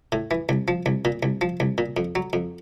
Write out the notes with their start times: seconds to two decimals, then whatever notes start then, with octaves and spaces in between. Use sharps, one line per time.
0.12 A2
0.31 E3
0.49 C2
0.68 F3
0.86 C2
1.05 A#2
1.23 C2
1.41 F3
1.60 C2
1.78 A#2
1.97 F2
2.15 F#3
2.33 F2